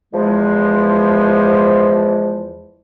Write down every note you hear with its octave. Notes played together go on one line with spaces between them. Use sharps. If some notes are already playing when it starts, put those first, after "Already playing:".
E2 F3 G#3